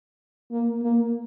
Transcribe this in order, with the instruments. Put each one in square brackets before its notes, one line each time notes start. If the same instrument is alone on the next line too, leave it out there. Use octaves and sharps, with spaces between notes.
[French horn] A#3
A#3